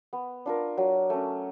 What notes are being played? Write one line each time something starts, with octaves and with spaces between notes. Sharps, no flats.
B3
D4 F4 A#4
F#3
A3 C#4